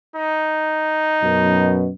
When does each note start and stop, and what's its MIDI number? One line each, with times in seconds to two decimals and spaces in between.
0.16 1.79 63
1.22 1.88 42
1.22 1.88 47